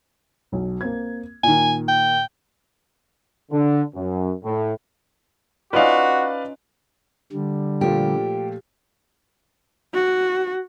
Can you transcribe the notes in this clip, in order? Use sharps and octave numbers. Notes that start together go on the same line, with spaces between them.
B1 B2
A#3 C4 G#6
A#2 D#3 G#5
G5
D3
F#2
A2
C#4 D#4 F4 F#4 B4 D5 F5
D3 G3
A#2 F3 A3 G4
F#4